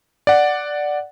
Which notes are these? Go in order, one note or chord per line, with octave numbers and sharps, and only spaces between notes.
D5 F#5